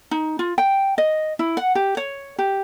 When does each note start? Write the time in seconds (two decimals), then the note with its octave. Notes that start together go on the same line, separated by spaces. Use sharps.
0.11 D#4
0.39 F4
0.58 G5
0.98 D#5
1.39 E4
1.57 F#5
1.75 G4
1.97 C#5
2.39 G4